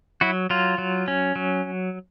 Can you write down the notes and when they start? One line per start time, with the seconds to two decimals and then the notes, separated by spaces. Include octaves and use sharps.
0.21 F#3 E4 F#4
0.50 F#3 F4
0.78 F#3
1.08 C#4
1.36 F#3